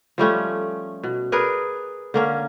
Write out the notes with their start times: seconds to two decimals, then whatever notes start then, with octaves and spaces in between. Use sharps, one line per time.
0.18 F3 G3 A3 C#4
1.04 B2
1.32 G#4 A#4 B4 D5
2.14 D3 A#3 C#4